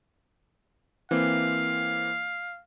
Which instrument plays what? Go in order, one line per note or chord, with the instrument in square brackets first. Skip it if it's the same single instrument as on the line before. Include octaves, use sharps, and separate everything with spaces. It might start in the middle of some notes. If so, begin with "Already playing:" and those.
[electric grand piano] E3 A#3 C4 [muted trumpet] F5